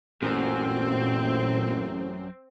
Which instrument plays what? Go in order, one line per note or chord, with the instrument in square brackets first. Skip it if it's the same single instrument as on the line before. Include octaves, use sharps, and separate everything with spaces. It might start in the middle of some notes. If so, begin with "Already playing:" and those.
[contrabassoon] A1 [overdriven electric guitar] F#2 [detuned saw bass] A#2 [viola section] C4